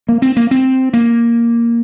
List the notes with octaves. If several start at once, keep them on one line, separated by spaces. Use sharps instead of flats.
A#3
C4
A#3
C4
A#3